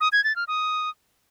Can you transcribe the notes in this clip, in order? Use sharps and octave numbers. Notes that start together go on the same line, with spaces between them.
D#6
G#6
A6
F6
D#6